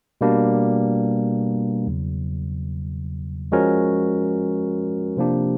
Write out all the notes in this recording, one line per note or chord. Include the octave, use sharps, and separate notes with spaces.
B2 G3 A#3 D4
E2 C#3 F#3
F3 G#3 C#4 F#4 A#4
C3 F3 A#3 D4 G4